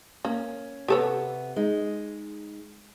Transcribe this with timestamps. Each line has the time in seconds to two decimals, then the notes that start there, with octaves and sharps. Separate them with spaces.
0.25 A#3 C#4
0.88 C3 B3 G4 A4 C#5
1.56 G#3 D#4